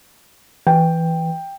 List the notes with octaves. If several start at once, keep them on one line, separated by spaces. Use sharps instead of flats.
E3 G5